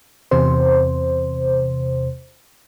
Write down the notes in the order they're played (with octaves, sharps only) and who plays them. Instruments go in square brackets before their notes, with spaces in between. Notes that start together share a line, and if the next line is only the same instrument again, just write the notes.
[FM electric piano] E2 C3 C5